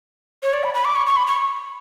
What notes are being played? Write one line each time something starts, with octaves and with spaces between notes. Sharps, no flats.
C#5
D5
B5
B5
D6
C#6
C#6
B5
C#6